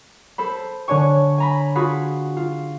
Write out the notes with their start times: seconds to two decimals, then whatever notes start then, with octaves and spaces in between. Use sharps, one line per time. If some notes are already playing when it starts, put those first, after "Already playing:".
0.38 A4 C5 B5
0.88 D3 D4 C#5 G#5 C#6
1.38 G#5 A#5 B5
1.75 F4 F#4 G#4 B5
2.37 F4